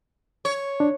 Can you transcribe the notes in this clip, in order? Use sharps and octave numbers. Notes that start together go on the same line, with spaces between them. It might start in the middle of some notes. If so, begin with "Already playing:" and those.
C#5
D4